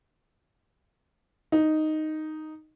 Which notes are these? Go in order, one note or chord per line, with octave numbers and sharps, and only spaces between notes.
D#4